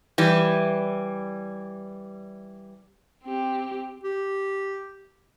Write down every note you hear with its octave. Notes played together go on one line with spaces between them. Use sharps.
E3 G3
C4 G4
G4